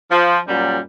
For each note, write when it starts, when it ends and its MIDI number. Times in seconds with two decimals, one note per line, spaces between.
0.11 0.38 53
0.48 0.79 42
0.48 0.79 46
0.48 0.79 54
0.48 0.79 55